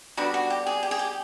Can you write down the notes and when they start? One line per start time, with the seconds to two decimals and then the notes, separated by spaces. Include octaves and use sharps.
0.17 D3 G3 B3 D4 F#4
0.34 F#4
0.50 G4
0.67 G#4
0.83 G4
0.91 G#4
0.99 G4